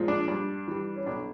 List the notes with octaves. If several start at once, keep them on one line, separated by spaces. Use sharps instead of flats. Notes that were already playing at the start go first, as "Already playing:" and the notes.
Already playing: A#2 F3 G#3
D4
G2 D4
E3 G3
C#4
B1 D4